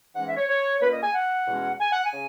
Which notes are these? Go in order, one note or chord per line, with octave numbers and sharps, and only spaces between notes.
G#2 E3 G#3 C#4 F#5
E5
C#5
C#5
A#2 A#3 C#4 B4
D#5
G#5
F#5
E2 B2 G#3 C#4
G#5
F#5
G#5
C#3